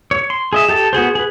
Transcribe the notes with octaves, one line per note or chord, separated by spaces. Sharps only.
C#5
C6
G#4 D#5 E5
G4 A4 A5
B3 F#4 G#4 C5
G#4 B4